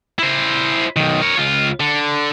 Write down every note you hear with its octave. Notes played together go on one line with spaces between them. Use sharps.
E4 C5
B1 D#3
A#4 C#5
C#2 F4
D3